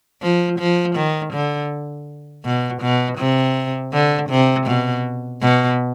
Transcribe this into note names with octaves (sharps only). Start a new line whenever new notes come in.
F3
F3
D#3
D3
B2
B2
C3
D3
C3
B2
B2